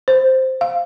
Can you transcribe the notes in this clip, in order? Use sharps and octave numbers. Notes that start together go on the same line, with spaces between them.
C5
F5